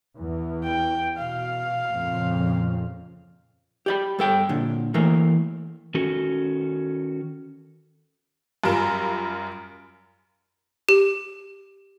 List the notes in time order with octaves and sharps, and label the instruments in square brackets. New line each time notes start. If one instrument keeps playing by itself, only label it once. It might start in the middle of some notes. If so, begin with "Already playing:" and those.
[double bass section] E2
[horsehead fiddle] G5
[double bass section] B2 [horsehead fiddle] F5
[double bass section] F2 A#2 C#3
[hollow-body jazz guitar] G4 D5 B5
G2 A4 G5
A#2 D3
E3 A3 A#3
[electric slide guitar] D#3 C#4 F#4 A4
[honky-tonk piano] F#2 G3 F4 A#4 E7
[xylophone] G4